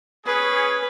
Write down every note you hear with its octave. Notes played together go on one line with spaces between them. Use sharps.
C#4 G#4 B4